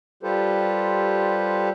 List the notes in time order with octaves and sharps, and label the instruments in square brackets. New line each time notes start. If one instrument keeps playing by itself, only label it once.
[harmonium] G3 F4 G4 A4 B4 C5